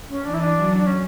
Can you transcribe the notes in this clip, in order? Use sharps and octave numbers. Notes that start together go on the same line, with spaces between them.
C#4
E3 D4
E4
D4
F#3
D4
C#4